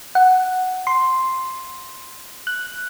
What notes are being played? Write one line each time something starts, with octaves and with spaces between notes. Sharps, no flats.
F#5
C6
F#6